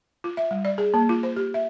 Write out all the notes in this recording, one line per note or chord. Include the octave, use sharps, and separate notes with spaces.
F4
E5
G3
D5
G#4
A#3
F4
C5
G4
E5